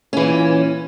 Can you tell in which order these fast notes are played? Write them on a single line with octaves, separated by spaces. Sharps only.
C#4 E3 A#2